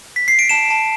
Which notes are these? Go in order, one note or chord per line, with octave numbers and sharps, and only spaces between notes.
B6
C7
D7
A5 E7
A5